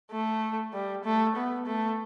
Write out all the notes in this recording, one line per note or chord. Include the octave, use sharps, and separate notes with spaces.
A3
G3
A3
B3
A3